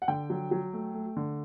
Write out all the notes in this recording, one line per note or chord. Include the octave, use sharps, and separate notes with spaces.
F#5
D3 G5
F#3
F#3
A3
A3
D3